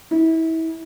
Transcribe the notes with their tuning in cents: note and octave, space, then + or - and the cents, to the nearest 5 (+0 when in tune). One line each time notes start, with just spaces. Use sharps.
E4 -30